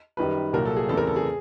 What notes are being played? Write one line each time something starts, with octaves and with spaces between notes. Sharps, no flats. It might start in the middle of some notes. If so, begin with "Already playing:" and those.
F#2 D#3 G3 B4
C2 A#2 F#3 A#4
A4
G#4
E2 C#3 E3 A3 C4 A4
A#4
A4
G#4